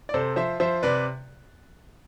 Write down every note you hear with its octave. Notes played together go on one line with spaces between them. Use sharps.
D5
C3 A4 C5
F3 C5 E5
F3 C5 E5
C3 B4 D5